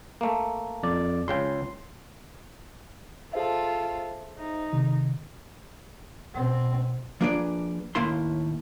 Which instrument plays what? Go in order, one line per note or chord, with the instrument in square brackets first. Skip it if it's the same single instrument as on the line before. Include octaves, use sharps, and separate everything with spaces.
[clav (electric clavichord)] A3 A#3
[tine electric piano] F2 D5
[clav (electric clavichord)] C#2 C#3 G5 [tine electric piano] C6
[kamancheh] F4 A4 [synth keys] G#4 C5 E5
[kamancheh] D#4
[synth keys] C3 D#3
[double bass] B2 C4
[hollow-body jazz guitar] F3 A#3 D4 G#4 B4 D5
D#2 A2 A#3 E4 C6